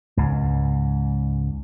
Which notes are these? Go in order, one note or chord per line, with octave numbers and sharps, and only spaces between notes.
C#2 G#2